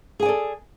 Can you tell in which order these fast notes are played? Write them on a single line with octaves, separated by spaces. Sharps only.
G#4 G#5 D5 A4